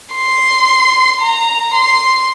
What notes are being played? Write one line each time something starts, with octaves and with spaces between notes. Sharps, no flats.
C6
A#5
C6